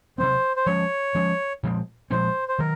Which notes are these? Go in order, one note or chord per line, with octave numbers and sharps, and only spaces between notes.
C3 F#3 C4 C5
C5
F3 G#3 C#4 C#5
F3 G#3 C#4
A#2 F3 G#3 C4
A#2 F3 G#3 C4 C5
C5
D#3 F#3 A#4